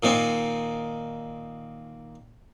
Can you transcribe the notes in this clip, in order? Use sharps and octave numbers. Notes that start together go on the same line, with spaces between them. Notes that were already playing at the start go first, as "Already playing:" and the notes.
A#2 D#3 C4